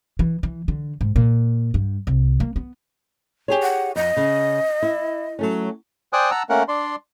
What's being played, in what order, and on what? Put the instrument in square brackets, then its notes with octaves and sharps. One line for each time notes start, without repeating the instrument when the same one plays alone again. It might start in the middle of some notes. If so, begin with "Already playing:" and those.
[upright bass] E3
E3
D3
G#2
A#2
G2
C2
A#3
B3
[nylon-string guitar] G4 G#4 C#5
[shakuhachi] F#5
[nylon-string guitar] F2 [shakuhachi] D#5
[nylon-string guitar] C#3
E4
F#3 A3 C#4
[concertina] C5 D5 G5 G#5 D#6 F#6
F#5 A5 A#5 E6
A3 A#3 C#4 A#4 F#5
D4 D5 C6